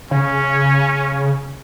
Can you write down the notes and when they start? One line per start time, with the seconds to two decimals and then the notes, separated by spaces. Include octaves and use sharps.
0.11 C#3 C#4